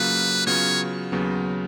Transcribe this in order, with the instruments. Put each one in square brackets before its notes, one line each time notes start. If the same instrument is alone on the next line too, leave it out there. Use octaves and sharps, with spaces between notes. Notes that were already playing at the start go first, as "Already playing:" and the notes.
Already playing: [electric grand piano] C#3 F#3 A#3 F4 [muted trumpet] B4
[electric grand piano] C#3 F#3 B3 F4 [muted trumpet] C#5
[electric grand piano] D#2 C#3 F#3 B3